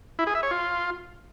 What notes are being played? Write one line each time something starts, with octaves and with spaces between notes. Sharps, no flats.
E4
G#4
E5
C#5
F4